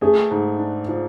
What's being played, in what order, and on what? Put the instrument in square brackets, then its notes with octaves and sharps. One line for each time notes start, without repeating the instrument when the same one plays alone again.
[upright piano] A3 [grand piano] G#4
[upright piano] G#2
D4
F3